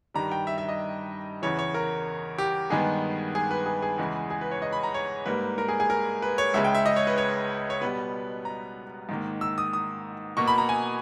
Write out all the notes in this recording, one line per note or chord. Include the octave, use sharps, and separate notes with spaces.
G2 D#3 G3 A#5
G5
E5
E5
D#5
E2 C#3 E3 C#5
C#5
A#4
G4
G2 D#3 G#3 B3 G#4
G#4
B4
G#4
G#4
E2 C#3 E3 G#3
G#4
B4
C#5
D#5
B5
A#5
C#5
G#2 G3 A#3 B4
A#4
G#4
G#4
A#4
B4
C#5
C#2 C#3 G#3 E5
G5
E5
D#5
C#5
B4
C#5
C#5
B2 G3 B3 B4
A#5
G#2 D#3 A#3
E6
D#6
D#6
B2 A#3 C#6
B5
A#5
G#5